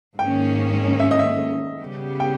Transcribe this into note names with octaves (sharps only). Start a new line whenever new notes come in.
G#2 D#3 A#3 C#4 G5
E5
D#5
E5
C#3 G3 B3 G4
G5